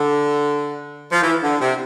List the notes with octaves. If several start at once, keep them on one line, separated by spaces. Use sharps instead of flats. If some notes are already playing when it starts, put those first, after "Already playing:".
Already playing: D3
F3
E3
D3
C3